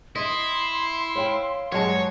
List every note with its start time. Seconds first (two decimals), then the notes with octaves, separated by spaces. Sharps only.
0.16 E4 D#5 C6
1.15 C#5 F5 G5
1.72 G2 F#3 G#3 F#4 C#5 A5